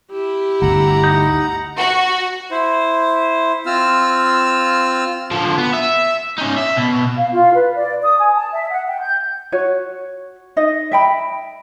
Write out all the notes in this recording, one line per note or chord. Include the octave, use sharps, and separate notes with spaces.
E4 G4
G1 D2 F#5 A#5
D#4
F#4
E4 C5
C4 F4 E6 F6
D3 F3
B3
E5
C#4 D#4
E5
B2
F5
F4
B4
D5
D#6
G#5
A5
E5
F#5
G5
G6
F#4 C#5
D#4 D#5
E5 G5 B5